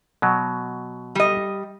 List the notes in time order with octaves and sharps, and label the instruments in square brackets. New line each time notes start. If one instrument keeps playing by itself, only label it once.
[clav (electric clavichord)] B2 F#3
[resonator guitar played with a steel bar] G3 D#5